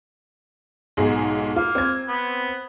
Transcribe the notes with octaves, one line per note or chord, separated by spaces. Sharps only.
B1 G#2 G#4
A#3 F4
C4 G#6
B3